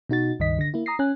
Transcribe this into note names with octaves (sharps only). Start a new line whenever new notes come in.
B2 D#4 F#4 A6
C#2 G2 D#3 D#5 B6
D3 A#6
A#3 E4
A#5 D#6 A#6 C7
C#4 G#5 F#6